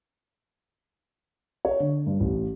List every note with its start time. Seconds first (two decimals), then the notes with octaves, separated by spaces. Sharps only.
1.65 C#5
1.80 D3
2.06 G2
2.20 A1